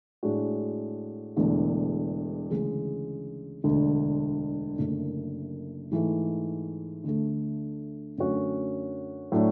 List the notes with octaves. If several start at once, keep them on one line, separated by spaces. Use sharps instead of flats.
A2 G#3 D4 F#4
E1 E2 D3 A3
D2 C#3 E3 G#3
E1 D2 D3
F#1 F#2 D3 A3
G#2 E3 A3
D2 D3 A3
F#2 D3 A3 C#4 F#4
A2 F#3 A3 D4